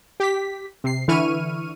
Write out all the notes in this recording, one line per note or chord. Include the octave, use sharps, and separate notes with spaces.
G4 B6
C3 C7
D3 E3 E4 C#6 F6 D#7